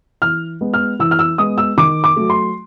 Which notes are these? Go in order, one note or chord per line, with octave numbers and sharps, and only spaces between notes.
E3 F6
G#3 B3
F6
E3 E6
F6
E6
G#3 B3 D#6
E6
D#3 D6
D6
F#3 A3
C6